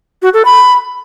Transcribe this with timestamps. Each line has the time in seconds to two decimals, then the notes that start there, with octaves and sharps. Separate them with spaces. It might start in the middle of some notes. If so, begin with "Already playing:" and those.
0.22 F#4
0.34 A4
0.45 B5